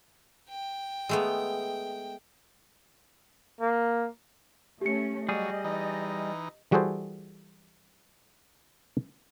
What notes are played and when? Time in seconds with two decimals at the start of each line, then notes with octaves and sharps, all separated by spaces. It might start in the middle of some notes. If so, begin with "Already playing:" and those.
0.49 G5
1.09 G#3 A3 B3
3.61 A#3
4.81 A3 C#4 G4 C#7
5.29 F#3 G3 G#4 D#5
5.64 E3 D#4
6.71 E3 G3 F#4 G#4 A4 C5